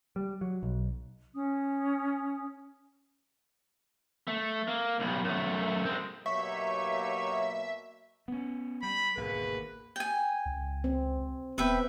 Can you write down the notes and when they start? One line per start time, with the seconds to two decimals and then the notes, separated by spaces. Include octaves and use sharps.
0.16 G3
0.41 F#3
0.63 B1
1.34 C#4 D#6
4.28 A3
4.68 A#3
5.00 B1 G3
5.24 F#2 A3
5.85 G#3 C4
6.26 B2 F#3 A#3 D#4 G4 C#5 E5 C#6
8.28 B3 C#4
8.83 G3 B5
9.17 G#1 D2 B2 A#3 G#4 B4
9.96 G5 G#5
10.46 C#2
10.84 C4
11.58 D#1 B3 C4 B4 E5 G5